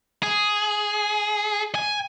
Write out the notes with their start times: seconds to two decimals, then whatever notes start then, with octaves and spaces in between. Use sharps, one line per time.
0.23 G#4
1.75 G#5